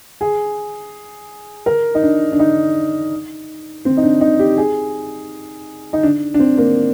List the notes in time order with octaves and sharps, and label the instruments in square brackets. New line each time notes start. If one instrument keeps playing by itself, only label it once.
[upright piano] G#4
A#4
D#4
D4
D4
D#4
C4
D#4
D4
D#4
G4
G#4
D#4
D4
D4
C4
A#3